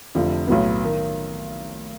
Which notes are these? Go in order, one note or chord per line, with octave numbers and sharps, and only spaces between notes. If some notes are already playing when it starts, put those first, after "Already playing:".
F1 F2 D3 F3
B1 A2 F#3 B3
D#3